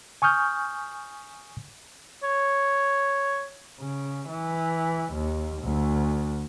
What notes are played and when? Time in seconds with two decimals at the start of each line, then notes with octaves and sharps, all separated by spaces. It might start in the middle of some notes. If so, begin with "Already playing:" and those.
0.22 G#5 C#6 D#6 F6 G6
2.23 C#5
3.80 C#3
4.28 E3
5.13 D#2
5.62 D2